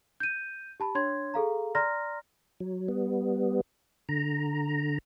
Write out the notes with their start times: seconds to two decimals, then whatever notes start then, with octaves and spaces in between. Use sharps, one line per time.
0.20 G6 D#7
0.80 G4 A5 B5
0.95 D4 C#5 C6 G#6
1.34 G#4 A4 F5 A#5
1.75 D5 A#5 C6 F6 A#6
2.60 F#3
2.88 G3 B3
4.09 D3 A#5